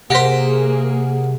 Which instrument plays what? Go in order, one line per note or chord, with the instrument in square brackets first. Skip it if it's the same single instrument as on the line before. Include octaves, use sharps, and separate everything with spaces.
[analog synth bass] C3 [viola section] A#3 G#4 [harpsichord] G4 C5 [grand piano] F#5 A#6 B6